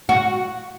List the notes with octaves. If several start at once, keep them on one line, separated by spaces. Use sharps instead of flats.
F#4